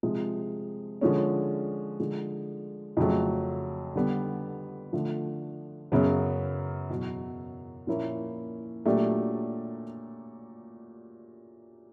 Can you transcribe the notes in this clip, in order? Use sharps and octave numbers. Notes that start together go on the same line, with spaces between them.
C3 F3 G#3
D3 F3 G#3 C#4
D3 F3 G#3
F2 C#3 F#3 A3
D3 G3 B3
D3 F3 A3
F#2 C#3 F#3 B3
E2 B2 F#3
A#2 F3 A#3 C#4 E4
A#2 F#3 A3 D4 G4